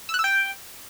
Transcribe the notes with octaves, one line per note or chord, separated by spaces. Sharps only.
E6
F#6
E6
G5